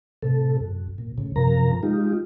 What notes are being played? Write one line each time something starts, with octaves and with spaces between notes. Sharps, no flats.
A2 C3 A4
F#2
A#2
A2 C#3
F#2 C3 F3 A#4 A#5
G#3 D#4 F4 G4